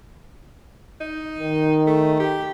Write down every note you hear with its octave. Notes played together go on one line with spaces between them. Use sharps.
D#4
D#3
A3
G4